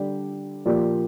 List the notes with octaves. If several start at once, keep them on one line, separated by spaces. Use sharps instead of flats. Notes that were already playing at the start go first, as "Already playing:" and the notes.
Already playing: D3 G3 D4 G4
A#2 F3 A#3 G4 D5